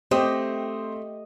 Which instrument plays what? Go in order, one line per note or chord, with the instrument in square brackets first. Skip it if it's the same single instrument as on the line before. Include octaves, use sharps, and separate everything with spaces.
[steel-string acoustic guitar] A3 [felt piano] C4 C5 [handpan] G4 [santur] D#5